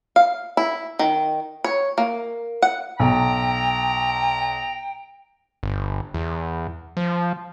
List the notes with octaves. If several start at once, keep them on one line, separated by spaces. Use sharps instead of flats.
F5
E4
D#3
C#5
A#3
F#5
B1 G5 A#5
G1
E2
F3